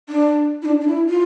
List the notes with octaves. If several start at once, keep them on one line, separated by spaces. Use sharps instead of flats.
D4
E4
D4
D4
E4
F4